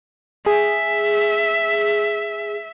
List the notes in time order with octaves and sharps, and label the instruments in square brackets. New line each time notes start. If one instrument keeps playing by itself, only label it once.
[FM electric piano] G#4 [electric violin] E5